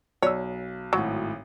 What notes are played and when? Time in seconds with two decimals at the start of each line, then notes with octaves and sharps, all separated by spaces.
0.22 B1 C#5 D5 E6
0.93 G#1 A2 F#3